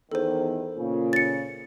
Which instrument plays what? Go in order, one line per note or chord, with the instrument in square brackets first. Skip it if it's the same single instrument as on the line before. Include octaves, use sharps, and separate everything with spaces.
[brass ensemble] E2 D#3 [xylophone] A4 C5
[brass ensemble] A#2 C#3
[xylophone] A6 C#7